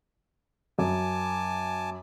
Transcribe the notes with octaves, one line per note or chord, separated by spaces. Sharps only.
F#2 G#5 A5 D6